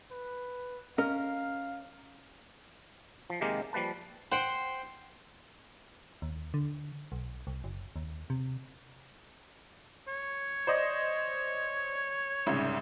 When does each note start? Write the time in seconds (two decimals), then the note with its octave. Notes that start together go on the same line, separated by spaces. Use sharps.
0.11 B4
0.98 C#4 A#4 D#5 F5
3.30 F3
3.41 C3 D#3 G#3 A#3 G4 A#4
3.73 F3 G3 A#3 B4 A5
4.32 C5 F#5 G5
6.22 D#2
6.54 D3
7.12 B1
7.47 C2
7.64 F#1
7.96 D#2
8.30 C3
10.08 C#5
10.67 C5 D5 D#5
12.46 C2 G#2 C#3